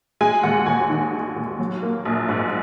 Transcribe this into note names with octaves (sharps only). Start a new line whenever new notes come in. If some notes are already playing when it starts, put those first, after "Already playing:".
G#3 G#5
D#2 F#5
D#2 G#5
D#3
G#3
D#2
F#3
A#3
A#1
G#2